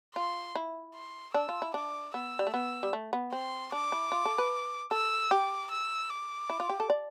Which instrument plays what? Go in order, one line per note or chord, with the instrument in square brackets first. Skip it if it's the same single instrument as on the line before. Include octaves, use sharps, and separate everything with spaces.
[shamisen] F4 [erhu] C6
[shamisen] E4
[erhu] C6
[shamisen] D4 [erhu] E6
[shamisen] F4
E4
[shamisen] D4 [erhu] D6
[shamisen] B3 [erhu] E6
[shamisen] G3
A3
[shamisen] B3 [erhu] E6
[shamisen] G3
A3
B3
[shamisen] C4 [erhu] C6
[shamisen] D4 [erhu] D6
[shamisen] E4
F4
A4
B4
[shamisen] A4 [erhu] E6
[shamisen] G4 [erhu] D6
[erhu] E6
D6
[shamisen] E4
F4
G4
A4
D5